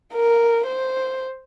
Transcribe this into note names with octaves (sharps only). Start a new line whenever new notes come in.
A#4
C5